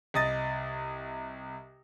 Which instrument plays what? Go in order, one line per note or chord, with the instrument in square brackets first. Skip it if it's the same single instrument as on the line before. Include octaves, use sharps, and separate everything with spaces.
[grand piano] C2 D#5 A6